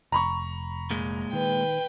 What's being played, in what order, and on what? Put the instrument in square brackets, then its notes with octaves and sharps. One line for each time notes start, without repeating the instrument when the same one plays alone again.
[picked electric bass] F1 [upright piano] A#5 B5 C#6
[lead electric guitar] A#2 G#3
[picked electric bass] D#3 [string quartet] B4 G5